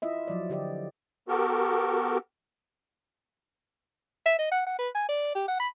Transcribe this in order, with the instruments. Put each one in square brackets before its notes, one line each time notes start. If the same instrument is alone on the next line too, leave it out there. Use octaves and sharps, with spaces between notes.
[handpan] E4 F4 D#5 E5
F3 F#3 D5
D3 G4 D5 D#5
[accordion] B3 F#4 G4 A4 A#4
[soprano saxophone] E5
D#5
F#5
F#5
B4
G#5
D5
G4
F#5
B5